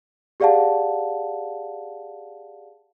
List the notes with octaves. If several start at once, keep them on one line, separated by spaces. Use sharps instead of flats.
G4 G#4 D5 F5 F#5 A5